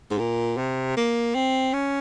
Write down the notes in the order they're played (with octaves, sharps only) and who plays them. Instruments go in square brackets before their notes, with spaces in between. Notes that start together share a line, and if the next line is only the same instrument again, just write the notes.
[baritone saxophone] G#2
A#2
C3
A#3
C4
C#4